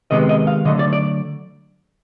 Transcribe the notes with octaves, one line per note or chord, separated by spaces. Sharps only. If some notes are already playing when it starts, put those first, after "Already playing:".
C3 D#3 G#3 B3 D#5
D#5
F5
D3 F#3 A3 D#5
D5
D5